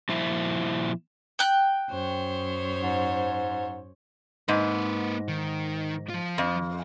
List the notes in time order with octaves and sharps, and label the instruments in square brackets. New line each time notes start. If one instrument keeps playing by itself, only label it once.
[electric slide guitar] A#2 F3 E4 C5 E5
[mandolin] G5 F#6
[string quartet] F#2 C5 C#5
[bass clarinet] G#2
[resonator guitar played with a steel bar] G#2 [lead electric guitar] A#3 B4
[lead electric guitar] D#3
F3 F4
[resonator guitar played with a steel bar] F2